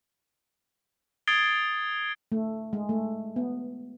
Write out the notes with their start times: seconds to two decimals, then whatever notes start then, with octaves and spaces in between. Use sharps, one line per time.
1.27 D#6 G#6 A6 C7 D7 G7
2.32 A3
2.73 G#3
2.89 A3
3.36 B3